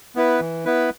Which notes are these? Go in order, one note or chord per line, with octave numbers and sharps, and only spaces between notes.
B3 E4 B4
E3
B3 E4 B4